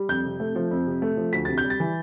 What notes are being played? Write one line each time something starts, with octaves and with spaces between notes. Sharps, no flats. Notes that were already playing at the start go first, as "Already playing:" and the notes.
Already playing: G3
F2 G6
C3
A3
F3
F2
C3
A3
F3
D2 B6
C3 A6
G6
G3
A6
E3